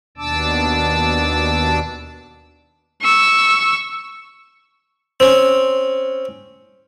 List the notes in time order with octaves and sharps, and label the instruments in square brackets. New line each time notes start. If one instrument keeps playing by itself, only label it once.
[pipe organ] D#2 B2 D4 A5 D6 E6
[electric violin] C#6 E6
[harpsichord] C4 C#4